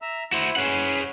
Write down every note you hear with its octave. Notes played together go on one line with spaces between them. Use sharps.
E5 A#5 E6
E4 F#4 C5
C#4 G#4 B4 F#5